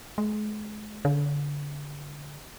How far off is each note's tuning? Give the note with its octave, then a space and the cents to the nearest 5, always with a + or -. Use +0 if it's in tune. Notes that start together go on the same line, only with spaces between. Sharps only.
G#3 +35
D3 -25